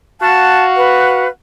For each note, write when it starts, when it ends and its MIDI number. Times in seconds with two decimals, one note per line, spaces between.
0.21 1.25 66
0.21 1.25 77
0.21 1.25 78
0.21 0.64 81
0.77 1.28 71